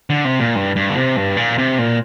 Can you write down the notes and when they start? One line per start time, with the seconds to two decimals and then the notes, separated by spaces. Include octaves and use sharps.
0.10 D3
0.25 C3
0.40 A#2
0.56 G2
0.76 G2
0.90 D3
0.97 C3
1.16 G2
1.37 A#2
1.58 C3
1.79 A#2